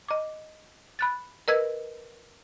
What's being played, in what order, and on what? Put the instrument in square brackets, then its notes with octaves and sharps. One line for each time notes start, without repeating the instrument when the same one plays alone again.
[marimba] D#5 D6
B5 F#6 A6
A#4 B4 D#5 E6 G#6